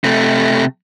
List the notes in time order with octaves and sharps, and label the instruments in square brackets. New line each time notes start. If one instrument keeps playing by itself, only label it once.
[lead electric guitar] C3 A3